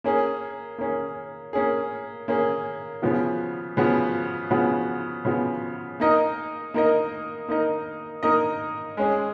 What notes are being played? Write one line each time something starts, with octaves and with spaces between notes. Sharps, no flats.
A#3 C#4 G#4
A#3 C#4 G#4
A#3 C#4 G#4
A#3 C#4 G#4
C#3 F3 B3 F#4
C#3 F3 B3 F#4
C#3 F3 B3 F#4
C#3 F3 B3 F#4
A#3 D#4 A#4 D#5
A#3 D#4 A#4 D#5
A#3 D#4 A#4 D#5
A#3 D#4 A#4 D#5
G#3 C#4 G#4